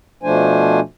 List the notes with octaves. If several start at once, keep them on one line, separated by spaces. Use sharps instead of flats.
B2 F3 A3 D4 C5 G#5